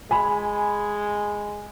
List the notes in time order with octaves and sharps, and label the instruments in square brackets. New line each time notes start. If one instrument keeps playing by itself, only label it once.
[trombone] G#3 [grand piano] G#5 B5